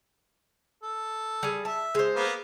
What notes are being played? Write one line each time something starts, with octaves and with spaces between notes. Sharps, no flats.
A4
G3 G#4
E5 A5
G#3 C5
A#3 B3